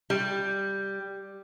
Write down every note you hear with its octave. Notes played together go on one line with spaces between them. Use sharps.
G3